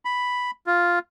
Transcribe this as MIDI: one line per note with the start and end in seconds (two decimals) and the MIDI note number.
0.05 0.51 83
0.66 0.99 65